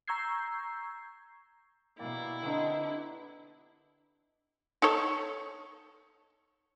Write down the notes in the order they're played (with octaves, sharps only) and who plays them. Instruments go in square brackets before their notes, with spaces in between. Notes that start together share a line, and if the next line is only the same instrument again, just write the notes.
[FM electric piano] A#5 C#6 E6 G6 G#6 C7
[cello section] B2 [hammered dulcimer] A#3 G4 D5 [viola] E4
[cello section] D3 D4 [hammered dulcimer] B3 C4 D#4
[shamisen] D#4 A4 C#5